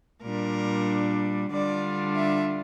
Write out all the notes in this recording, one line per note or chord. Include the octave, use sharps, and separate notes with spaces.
A#2 G3 D4 A#4
D3 G3 D4 F4 D5
E5